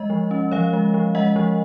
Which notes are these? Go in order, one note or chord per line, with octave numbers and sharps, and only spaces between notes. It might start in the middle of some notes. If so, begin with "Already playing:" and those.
Already playing: G#3 D#5
F3
C#4
F3 C#5 F5
G#3
F3
G#3 D#5 F#5
F3